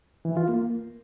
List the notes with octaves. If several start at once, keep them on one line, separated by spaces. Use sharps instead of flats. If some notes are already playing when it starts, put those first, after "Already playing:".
E3
F4
A#3